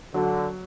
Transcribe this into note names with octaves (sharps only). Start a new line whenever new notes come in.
D3 F#3